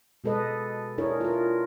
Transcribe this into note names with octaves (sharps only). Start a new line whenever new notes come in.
B2 G#3 A4 B4 D#5
D4 E4 G#4 A#4 C#5
F4 A#4